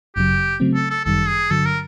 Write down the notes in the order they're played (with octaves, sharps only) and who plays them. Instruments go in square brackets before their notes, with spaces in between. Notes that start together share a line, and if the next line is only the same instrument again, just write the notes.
[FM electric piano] G1 F#2 C#3 F#3 [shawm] G4
[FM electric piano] C#3 F#3 A3 C4
[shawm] A4
A4
[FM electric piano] G1 F#2 D#3 G3 [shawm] A4
[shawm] G#4
[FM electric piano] G2 D3 F#3 [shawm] A4
[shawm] A#4